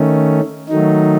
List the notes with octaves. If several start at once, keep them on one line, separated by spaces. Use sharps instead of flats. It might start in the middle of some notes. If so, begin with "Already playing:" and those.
Already playing: D#3 A3 C#4
D#3 F#3 A3 D#4